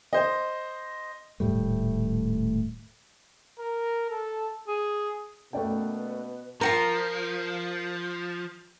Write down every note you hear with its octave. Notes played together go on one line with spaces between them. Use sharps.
C5 D#5
D#1 A2 G3 A3
A#4
A4
G#4
B2 A3 A#3 C#4 B4 D5 G5
F3 F4 F#4 A#4 A#5